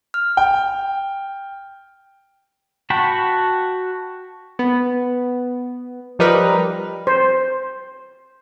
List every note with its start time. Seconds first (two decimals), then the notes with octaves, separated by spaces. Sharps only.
0.14 F6
0.37 G5
2.90 F#4 G5 A5 B5
4.59 B3
6.19 F3 G3 D#4 G4 A#4 B4
7.07 C5